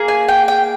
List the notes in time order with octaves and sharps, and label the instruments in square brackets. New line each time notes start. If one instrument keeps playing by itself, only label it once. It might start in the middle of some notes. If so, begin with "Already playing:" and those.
Already playing: [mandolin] A#3 G#4
G#5
G5
G5